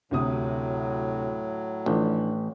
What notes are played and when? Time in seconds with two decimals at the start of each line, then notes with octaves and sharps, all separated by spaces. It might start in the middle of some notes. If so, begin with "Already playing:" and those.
0.11 D2 A2 C3 F#3 D#6
1.86 A1 F3 D4 E4